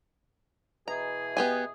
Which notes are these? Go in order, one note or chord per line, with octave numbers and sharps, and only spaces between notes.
B2 E3 G#4 A#5
B3 G4 G#5